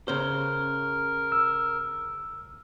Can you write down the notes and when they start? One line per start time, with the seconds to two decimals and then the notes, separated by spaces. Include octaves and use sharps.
0.08 C#3 A#4 C5
1.32 E6